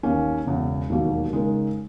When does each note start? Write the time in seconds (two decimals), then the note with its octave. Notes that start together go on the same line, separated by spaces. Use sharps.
0.03 D#2 D#3 A#3 C#4
0.46 E1 E2 C#3
0.90 E1 D#2 D#3 F#3 A#3
1.33 C#3 G#3 D#4 A#4